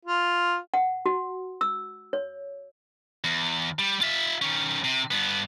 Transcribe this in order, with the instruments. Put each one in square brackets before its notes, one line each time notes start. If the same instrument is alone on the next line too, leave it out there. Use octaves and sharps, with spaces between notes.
[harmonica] F4
[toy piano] F#5
F#4
E6
C#5
[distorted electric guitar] E2
G3
F4 E5
D#3 C#4
C3
G2 B3